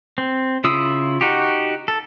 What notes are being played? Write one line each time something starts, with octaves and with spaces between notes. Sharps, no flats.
C4
C#3 E4 F4 D#6 E6
D#4 F#4 G4
A4